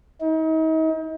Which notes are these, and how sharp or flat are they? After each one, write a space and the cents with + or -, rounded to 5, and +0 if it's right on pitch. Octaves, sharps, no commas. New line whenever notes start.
D#4 +40